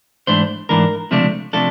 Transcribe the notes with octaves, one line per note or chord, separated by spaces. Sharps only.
G#2 E3 A3 D4 C5
G#2 E3 A3 D4 A#4
C#2 C3 F3 A3 D4
C3 F3 A3 D4 A4